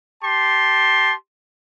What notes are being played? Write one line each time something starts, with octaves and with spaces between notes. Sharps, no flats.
G4 A5 C6